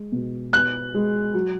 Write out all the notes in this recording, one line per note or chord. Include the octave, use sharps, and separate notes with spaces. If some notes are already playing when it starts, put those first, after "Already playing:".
Already playing: G#3
B2
B3 F#6
G#3
F#3